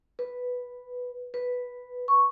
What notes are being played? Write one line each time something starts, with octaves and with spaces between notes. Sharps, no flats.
B4
B4
C#6